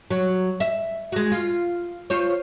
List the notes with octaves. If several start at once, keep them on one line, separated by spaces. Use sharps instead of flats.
F#3
E5
G#3 F#4
F4
F4 C5 C#5